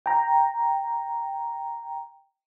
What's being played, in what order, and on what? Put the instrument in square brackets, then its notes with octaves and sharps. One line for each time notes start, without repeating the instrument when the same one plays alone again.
[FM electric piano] G5 A#5